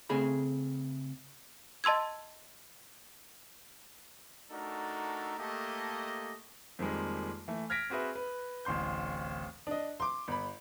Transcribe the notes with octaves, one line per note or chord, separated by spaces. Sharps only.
C#3 A3 C4 G#4 G#5 B5
D#5 A5 C6 E6 G#6
A3 D4 D#4 F#4 A4 A#4
A3 A#3 G4 A4 D#5
F2 D#3 F3 G3 G#3 A#3
E3 A3
F6 G#6 A#6 B6 D7
C4 F#4 G#4 B4 E5
B4
D1 A1 C6 G6
D4 D#5
C6 D6
G1 B5